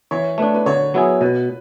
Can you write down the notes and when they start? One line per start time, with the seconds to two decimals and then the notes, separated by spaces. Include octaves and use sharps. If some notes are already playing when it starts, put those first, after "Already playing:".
0.11 E3 C#5
0.38 A3 D4 B4
0.54 B4
0.66 D3 C#5
0.94 F#3 B3 E4 G#4
1.21 B2 B4